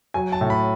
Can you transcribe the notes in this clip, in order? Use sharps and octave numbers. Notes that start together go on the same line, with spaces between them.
F#3 G#5
A5
A2
B5